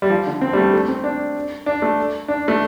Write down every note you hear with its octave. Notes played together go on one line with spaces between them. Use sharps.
G3
F3
D3
C4
G3
A3
A3
C4
D4
D4
A3
D4
A3